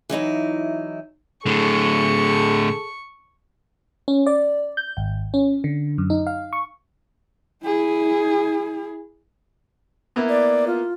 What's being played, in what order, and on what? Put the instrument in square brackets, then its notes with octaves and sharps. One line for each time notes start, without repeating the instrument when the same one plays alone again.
[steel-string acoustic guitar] E3 F#3 D#4 E4
[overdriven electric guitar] A2 D3 [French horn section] G#4 A4 [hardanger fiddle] C#6
[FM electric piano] C#4
D5
G6
G#1
C#4
D3
F#2
D#4
F5
C#6
[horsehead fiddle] E4 G#4
[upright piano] A#3 B3 E4
[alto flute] D5
F4